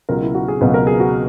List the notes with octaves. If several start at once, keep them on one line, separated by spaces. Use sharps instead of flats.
C#2 B2 F#3 A#4
E4
F#4
G#4
C#2 B2 F#3 B4
A#4
G#4
F#4